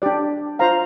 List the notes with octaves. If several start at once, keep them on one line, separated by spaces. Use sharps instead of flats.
D4 G4 D5
F4 C5 F5 A#5